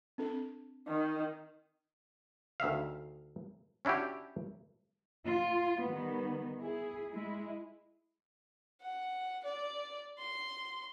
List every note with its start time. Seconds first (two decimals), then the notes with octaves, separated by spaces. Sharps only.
0.18 C4 D4 A4
0.88 D#3
2.60 D2 D#3 E5 F5
3.85 C#4 D4 E4 F#4 G4
5.26 F4
5.82 D#3 G3 B3
6.60 E4 G#4
7.11 G#3 E4
8.82 F#5
9.44 D5
10.19 C6